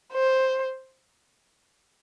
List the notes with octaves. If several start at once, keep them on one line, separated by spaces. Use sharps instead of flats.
C5